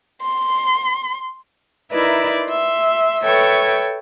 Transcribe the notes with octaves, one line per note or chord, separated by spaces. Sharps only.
C6
D#4 E4 A#4 B4 D5 E5
E5 C6
A4 B4 C#5 E5 G5 C#6